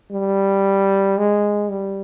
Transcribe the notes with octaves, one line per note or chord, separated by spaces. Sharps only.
G3
G#3
G3